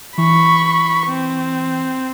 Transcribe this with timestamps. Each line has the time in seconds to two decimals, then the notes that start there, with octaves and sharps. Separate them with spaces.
0.18 E3 B5 C#6
1.07 C4